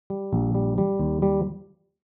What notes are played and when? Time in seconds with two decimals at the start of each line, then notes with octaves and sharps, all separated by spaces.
0.10 G3
0.33 A#1
0.55 G3
0.78 G3
0.99 D#2
1.22 G3